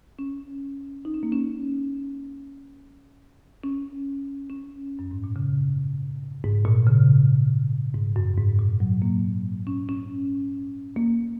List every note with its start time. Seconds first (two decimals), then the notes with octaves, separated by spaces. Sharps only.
0.19 C#4
1.05 D#4
1.14 C#4
1.23 A#3
1.32 C#4
3.64 C#4
4.50 C#4
4.99 F#2
5.11 G#2
5.24 A#2
5.36 C#3
6.44 G#2
6.65 A#2
6.87 C#3
7.95 G#2
8.16 F#2
8.38 G#2
8.59 A#2
8.80 F#3
9.02 A#3
9.67 C#4
9.89 C#4
10.96 A#3